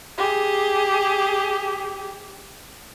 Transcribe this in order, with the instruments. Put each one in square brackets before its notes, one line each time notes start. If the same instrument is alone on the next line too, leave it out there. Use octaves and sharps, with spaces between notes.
[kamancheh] G4 G#4